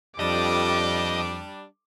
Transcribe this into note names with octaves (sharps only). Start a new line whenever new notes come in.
F2 G3 D4 D#5 D6